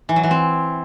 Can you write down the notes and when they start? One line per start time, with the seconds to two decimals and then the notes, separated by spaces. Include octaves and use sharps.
0.09 E3
0.16 F#3
0.23 E3
0.31 C4